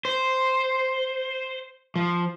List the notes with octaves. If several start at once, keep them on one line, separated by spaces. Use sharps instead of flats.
C5
F3